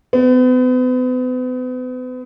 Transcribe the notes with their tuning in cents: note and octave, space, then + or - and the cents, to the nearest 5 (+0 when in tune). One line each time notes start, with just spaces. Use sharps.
B3 +40